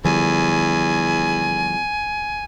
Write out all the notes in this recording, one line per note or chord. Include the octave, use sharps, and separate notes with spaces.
E2 D3 F3 G3 G#5